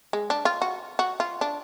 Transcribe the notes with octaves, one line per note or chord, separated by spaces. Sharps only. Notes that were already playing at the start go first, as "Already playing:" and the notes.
G#3
D4
F4
F#4
F#4
F4
D4